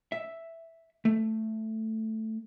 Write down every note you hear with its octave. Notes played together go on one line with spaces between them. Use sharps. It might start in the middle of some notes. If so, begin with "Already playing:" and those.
E5
A3